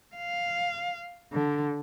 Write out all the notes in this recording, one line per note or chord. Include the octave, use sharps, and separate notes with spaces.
F5
D3